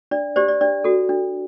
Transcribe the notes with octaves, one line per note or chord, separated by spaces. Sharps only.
D4 D5
G4 C5 D5
D5
D4 D5
F#4 A4
D4